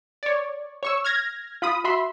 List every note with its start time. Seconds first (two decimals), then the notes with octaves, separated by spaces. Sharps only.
0.23 C#5 D5
0.83 C#5 C#6 E6
1.05 F6 G#6 A#6
1.62 F4 B5 D#6
1.84 F#4 E5 B5 C6